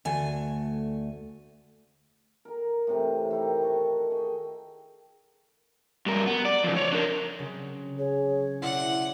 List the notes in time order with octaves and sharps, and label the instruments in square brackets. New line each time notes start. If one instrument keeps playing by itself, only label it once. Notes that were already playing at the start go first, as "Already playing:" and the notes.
[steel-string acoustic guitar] D2 A3 G#5
[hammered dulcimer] A#4 A#5
A2 C3 E3
D#3 E4 G4 A#5
F#4 A4 C#6
G#4 D#5 G5
[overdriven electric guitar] G2 A#4
B3
D5
F2 C#3
C#5 D5
D4 A#4
[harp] C#3 F#3 C4
[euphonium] G#4 [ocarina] C#5
[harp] B2 D5 C6 [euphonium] E4 [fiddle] F#5